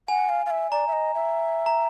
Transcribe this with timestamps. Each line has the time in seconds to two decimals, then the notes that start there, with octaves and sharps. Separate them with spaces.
0.08 F#5 G#5
0.29 F5
0.46 F5
0.50 E5
0.71 D5 A#5
0.88 E5
0.93 D#5
1.15 E5
1.66 A#5